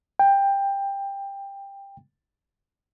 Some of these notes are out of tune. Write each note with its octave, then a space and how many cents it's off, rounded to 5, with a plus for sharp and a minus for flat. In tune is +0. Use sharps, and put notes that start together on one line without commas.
G5 +15